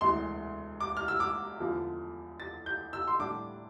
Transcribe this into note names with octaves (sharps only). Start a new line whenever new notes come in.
E1 D2 C3 E3 C6
D6
F6
E6
D6
E2 D3 F3 A3
A6
G6
E6
C6
A2 G3 D4 D6